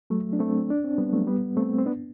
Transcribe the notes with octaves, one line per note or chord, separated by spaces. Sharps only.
F#3 A3
D4
A3 C4
D4
C4
G3 B3
F#3 A3
G3 B3
A3 C4
C4
B3 D4